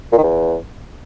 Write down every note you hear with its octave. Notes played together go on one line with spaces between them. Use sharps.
A#2
D#3
E2